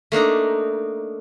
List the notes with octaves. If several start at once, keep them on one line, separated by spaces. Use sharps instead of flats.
A3 A#3 D4 D#4